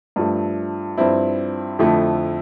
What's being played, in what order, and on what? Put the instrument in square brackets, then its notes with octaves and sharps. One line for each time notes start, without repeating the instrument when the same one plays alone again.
[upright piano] G2 F3 A3
G2 F3 C4 E4
F2 D3 F3 A3 E4